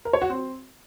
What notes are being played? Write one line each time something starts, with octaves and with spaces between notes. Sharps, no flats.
A#4
C#5
F#4
C4